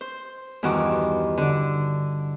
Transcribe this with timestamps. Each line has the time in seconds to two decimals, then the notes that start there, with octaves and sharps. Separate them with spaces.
0.01 C5
0.63 E2 G2 D#3 F#4 D6
1.38 D3 D5